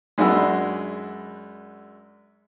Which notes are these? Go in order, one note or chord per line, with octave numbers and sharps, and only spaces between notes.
F#2 G#3 D4 F#4 B5 E6